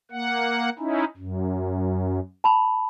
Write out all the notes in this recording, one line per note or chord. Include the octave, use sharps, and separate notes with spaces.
A#3 F#5
C#4 D#4 E4
F#2
A5 B5